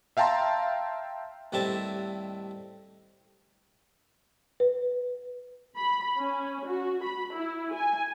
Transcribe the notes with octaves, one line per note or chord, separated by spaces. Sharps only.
E5 F5 G5 A5 A#5 C6
D#2 A2 G3 C4 E5 A5
B4
B5
C#4
F#4
B5
E4
G#5